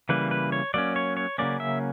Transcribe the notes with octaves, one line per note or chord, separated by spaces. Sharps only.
C#3 E3 G3 A#3 B4
B4
C#5
F#3 A#3 C#4 D5
C#5
C#5
C#3 F#3 A#3 C#4 D5
E5